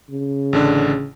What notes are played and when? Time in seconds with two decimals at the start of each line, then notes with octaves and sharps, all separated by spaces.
0.11 C#3
0.53 A1 D3 D4